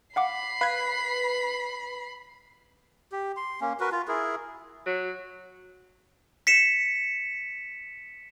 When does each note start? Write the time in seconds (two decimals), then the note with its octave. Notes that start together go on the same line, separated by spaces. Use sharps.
0.16 F5 F#5 B5 D6 C7
0.61 B4 F5 G#6
3.12 G4
3.37 C6
3.61 A#3 C#4
3.80 F#4 A#4 B4
3.92 F4
4.08 E4 G#4 A#4
4.86 F#3
6.47 B6 C#7 E7